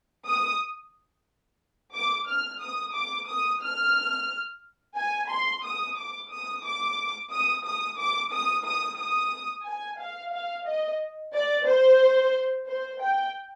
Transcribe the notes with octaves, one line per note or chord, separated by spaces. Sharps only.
D#6
D6
F6
D#6
D6
D#6
F6
G#5
C6
D#6
D6
D#6
D6
D#6
D#6
D6
D#6
D#6
D#6
G#5
F5
F5
D#5
D5
C5
C5
G5